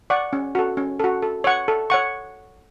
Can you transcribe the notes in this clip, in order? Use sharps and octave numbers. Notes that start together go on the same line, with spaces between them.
D5 F#5 C#6
C#4
F#4 A4
C#4
F#4 A4
A4
C#5 F#5 C#6
A4
C#5 F#5 C#6